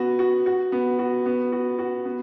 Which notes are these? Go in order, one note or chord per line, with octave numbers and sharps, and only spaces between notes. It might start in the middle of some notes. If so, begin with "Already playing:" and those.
Already playing: B3 F#4
F#4
F#4
B3
F#4
B3
F#4
F#4
B3